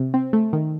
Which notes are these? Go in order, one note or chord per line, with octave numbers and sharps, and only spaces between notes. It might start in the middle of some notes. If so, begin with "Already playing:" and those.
Already playing: C3
C4
A3
D#3